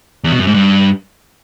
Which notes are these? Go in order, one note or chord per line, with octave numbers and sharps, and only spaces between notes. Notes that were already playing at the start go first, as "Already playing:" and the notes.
E2
B2
F#2
G#2
G2